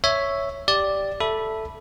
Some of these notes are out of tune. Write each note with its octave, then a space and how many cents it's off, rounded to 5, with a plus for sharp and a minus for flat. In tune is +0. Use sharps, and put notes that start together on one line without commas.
C#5 +0 E5 +0
G4 +0 D5 +0
A4 +0 E5 +0 B5 -10